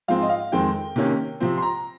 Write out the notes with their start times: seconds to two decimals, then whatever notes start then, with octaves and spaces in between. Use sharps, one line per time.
0.08 G#2 F3 G#3 C4 F5
0.22 D#5
0.30 F5
0.52 F2 D#3 G#3 C4 G5
0.96 C3 D#3 A#3 C#4
1.40 C3 F3 C4
1.58 C6
1.62 A#5